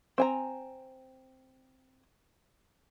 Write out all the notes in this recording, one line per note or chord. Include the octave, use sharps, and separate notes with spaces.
C4 G#5 A#5